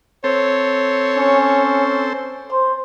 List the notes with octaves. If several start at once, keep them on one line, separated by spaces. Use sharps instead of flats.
C4 A4 C5 C#5
C#4
C5